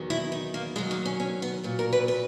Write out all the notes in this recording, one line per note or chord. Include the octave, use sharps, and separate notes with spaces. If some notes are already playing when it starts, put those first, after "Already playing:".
Already playing: E2 D#3 F#3
E4
D#4
A#3
D#2 D#3 F#3 G#3
A#3
C#4
C#4
B3
A#2 F#3
A#4
B4
B4